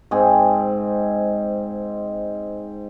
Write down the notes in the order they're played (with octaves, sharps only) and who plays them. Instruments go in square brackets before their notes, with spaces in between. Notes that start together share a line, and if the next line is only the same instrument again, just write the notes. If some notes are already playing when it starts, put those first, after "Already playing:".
[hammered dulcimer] G#2 C4 G#4